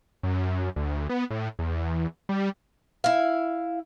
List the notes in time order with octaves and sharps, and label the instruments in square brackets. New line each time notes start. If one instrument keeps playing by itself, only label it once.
[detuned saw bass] F#2
D2
B3
A2
E2
G3
[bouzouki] E4 F5